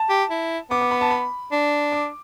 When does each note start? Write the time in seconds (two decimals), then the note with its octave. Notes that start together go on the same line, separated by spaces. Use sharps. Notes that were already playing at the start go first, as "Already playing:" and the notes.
Already playing: A5
0.10 G4
0.30 E4
0.70 B3 D6
0.81 D6
0.91 B5
1.01 A5
1.11 B5
1.52 D4
1.92 D6